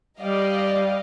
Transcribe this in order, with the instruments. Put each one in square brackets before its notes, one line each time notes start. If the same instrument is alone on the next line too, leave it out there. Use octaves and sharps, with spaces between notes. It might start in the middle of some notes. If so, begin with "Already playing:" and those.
[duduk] G3 [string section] D5 D#5 F5